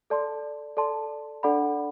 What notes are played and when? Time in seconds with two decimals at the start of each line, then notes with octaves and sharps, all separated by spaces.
0.10 A4 D5 A5 C6
0.77 A4 D5 A5 C6
1.43 D4 A4 D5 F#5 B5